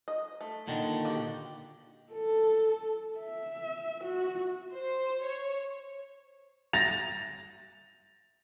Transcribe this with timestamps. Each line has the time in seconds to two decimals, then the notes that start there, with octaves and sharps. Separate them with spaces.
0.08 D#5
0.41 A3
0.68 A#2 D3 D#3
1.05 F#4 G4
2.12 A4
3.19 E5
4.04 F#4
4.74 C5
5.25 C#5
6.73 A6 A#6 F7